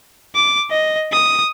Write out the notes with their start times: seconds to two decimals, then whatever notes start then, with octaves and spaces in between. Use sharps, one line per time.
0.35 D6
0.71 D#5
1.12 D#6